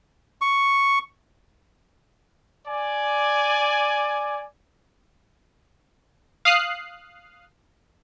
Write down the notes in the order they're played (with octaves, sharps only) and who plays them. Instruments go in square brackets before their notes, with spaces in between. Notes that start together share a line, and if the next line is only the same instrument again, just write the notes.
[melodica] C#6
[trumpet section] D5 G#5
[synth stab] F5 D#6 F#6 C7